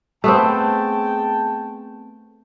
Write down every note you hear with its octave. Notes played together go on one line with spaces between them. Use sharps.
A3 B3 C4 G#4 G5 A5